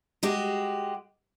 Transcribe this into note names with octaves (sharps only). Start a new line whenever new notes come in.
G#3 F#4 G4